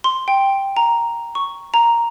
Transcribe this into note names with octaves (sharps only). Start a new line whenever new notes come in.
C6
G5
A#5
C#6
A#5